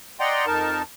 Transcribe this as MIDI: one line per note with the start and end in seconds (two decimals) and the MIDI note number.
0.20 0.46 74
0.20 0.46 75
0.20 0.46 78
0.20 0.46 79
0.20 0.46 82
0.20 0.46 84
0.46 0.82 41
0.46 0.82 63
0.46 0.82 70
0.46 0.82 81